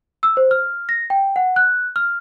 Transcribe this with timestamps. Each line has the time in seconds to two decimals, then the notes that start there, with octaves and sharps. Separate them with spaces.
0.23 E6
0.37 C5
0.51 F6
0.89 A#6
1.10 G5
1.36 F#5
1.56 F#6
1.96 F6